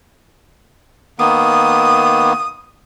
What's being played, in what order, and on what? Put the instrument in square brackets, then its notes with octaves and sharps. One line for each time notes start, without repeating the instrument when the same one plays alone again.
[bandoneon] D#3 A#3 B3 [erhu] D#6